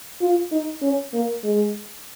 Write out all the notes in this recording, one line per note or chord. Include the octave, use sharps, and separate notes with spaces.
F4
D#4
C#4
A#3
G#3